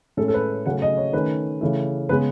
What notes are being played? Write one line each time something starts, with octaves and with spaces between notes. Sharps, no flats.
A2 G#3 C#4 A4
A4
B4
C#3 F#3 A3 C#4 F#5
D#5
C#5
D#3 A3 C#4 B4
C#3 E3 A3
C#3 G#3 B3 B4